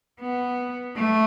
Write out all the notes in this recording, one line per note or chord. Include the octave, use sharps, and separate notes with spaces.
B3
A3